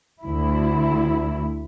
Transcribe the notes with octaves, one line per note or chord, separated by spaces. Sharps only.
D2 E4